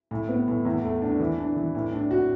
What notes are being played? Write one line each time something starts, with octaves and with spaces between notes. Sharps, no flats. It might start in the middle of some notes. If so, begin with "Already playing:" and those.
A2
B3
A2
E2
A3
D4
E3
D4
E3
A2
D4
F#4